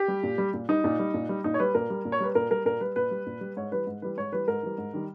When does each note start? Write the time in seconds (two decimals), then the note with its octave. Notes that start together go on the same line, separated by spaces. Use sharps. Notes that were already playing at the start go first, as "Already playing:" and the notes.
Already playing: G4
0.08 G3
0.23 A#2
0.38 G3
0.54 A#2
0.69 G3 D#4
0.84 A#2
0.99 G3
1.14 A#2
1.29 G3
1.44 A#2 D#4
1.54 C#5
1.60 G3 B4
1.75 A#2 A#4
1.90 G3
2.05 A#2
2.12 C#5
2.20 G3 B4
2.35 A#2 A#4
2.51 G3 A#4
2.65 A#2 A#4
2.81 G3 B4
2.96 A#2 B4
3.11 G3
3.27 A#2
3.41 G3
3.57 G#2 C#5
3.72 E3 G3 B4
3.87 G#2
4.02 E3 G3 B4
4.17 G#2 C#5
4.32 E3 G3 B4
4.47 G#2 A#4
4.63 E3 G3
4.78 G#2
4.93 D#3 G3